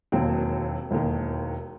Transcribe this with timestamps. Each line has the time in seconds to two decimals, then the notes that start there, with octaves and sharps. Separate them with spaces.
0.12 E1 D#2 D#3 F#3 C4
0.91 E1 D#2 D#3